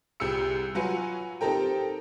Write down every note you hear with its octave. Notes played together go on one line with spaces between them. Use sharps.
C2 G3 G4 G#4 E6 C#7
F#3 F4 F#4 B4 G#5 C#7
C4 D#4 G4 A4 A#4 G5